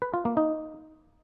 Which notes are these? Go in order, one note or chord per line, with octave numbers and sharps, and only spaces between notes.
B4
F4
A#3
D#4